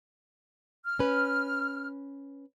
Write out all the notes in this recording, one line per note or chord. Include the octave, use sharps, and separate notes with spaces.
F6
C#4 B4